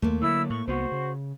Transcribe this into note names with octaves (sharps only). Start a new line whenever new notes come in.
D#2 A3 A#3
D3 F#3 E4 E6
A2 C#6
C2 B3 F#4 C5
C#3